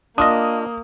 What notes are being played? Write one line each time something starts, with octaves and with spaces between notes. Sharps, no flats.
A#3 D4 F4 D#5 D#6